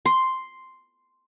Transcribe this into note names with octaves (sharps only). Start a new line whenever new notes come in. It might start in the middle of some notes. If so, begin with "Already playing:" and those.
C6